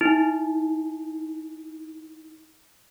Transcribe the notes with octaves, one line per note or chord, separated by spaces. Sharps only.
D#4 E4